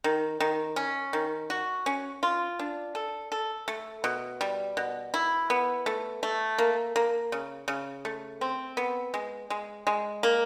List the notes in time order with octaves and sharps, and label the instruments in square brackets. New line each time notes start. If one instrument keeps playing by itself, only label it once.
[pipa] D#3
D#3
C#4
D#3
F#4
C#4
F4
D4
A4
A4
A3
B2
G3
B2
E4
B3
A3
A3
A#3
A#3
C#3
C#3
A3
C4
B3
G#3
G#3
G#3
A#3